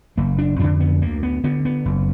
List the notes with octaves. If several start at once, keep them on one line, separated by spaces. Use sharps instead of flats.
F#1 A#3
D4
F2 D3 D4
B3
D2 A#3
B3
D3 B3
B3
F#1